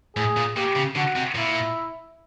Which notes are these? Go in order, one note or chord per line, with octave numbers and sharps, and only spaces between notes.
A2 G#4
A#2
A#2 G4
C#3
D3 F#4
C3
A#2 E4